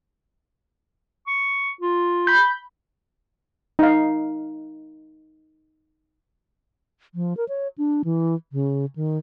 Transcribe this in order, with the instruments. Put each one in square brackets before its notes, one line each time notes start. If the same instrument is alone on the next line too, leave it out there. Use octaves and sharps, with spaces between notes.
[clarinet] C#6
F4
[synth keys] B5 G6
[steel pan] D#4 F5
[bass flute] F3
A#4
C#5
D4
E3
C#3
D#3